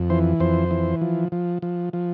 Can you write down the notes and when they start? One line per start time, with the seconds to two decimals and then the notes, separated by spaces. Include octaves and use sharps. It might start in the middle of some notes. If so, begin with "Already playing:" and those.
Already playing: F2
0.10 E3 C5
0.40 F2 C5
0.71 E3
1.01 F3
1.32 F3
1.62 F3
1.93 F3